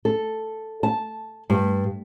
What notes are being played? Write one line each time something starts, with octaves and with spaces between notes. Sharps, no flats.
A4
A5
G2